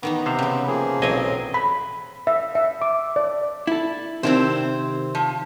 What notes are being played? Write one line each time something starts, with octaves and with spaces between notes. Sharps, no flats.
D#3 E3 B3 D#4
C3 C5 F5
C#3 C4
F3 A#3 G#4
B1 E3 F#3 C4 D#5 G#5
B5
E5
E5
D6
D5
E4 A4
C3 D#3 C4 E4 C5
F3